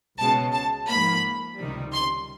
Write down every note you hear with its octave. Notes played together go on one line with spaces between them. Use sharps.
C#2 B2 G#3 C#4 A5
A5
G#2 F3 A#3 B5
C#2 C3 D#3 G3
C6